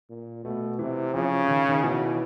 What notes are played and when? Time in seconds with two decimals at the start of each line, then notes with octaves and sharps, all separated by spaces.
0.10 A#2
0.44 B2 A3
0.79 C3 E3
1.14 C#3 F3
1.48 D#3
1.69 D#3
1.83 B2 E3